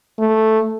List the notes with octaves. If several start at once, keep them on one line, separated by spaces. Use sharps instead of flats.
A3